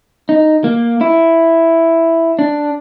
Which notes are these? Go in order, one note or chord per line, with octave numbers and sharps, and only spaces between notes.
D#4
A#3
E4
D4